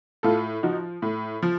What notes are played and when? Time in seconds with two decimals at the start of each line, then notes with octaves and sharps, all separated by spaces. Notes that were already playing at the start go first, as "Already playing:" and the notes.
0.23 A2 F4 A4
0.63 F3 D#4 F#4
1.02 A2
1.43 F3